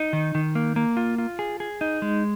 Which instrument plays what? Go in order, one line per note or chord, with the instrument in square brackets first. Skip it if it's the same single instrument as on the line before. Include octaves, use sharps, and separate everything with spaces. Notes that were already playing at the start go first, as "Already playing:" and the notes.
Already playing: [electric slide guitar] D#4
D#3
D#3
A#3
A#3
F4
F4
G#4
G#4
D#4
G#3